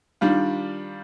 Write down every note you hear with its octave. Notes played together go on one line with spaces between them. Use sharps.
D#3 G3 D4 F4